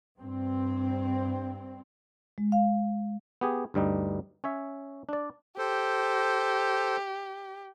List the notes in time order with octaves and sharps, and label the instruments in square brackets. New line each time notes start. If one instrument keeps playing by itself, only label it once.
[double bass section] G2 C4
[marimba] G#3
F5
[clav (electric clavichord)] B3 G4 G#4
D2 G2 G3 D#4
C#4 C#5 E5
D4 D5
[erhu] G4 [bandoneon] A4 C5